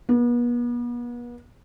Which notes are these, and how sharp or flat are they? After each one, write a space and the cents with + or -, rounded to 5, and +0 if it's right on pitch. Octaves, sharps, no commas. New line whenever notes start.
B3 -40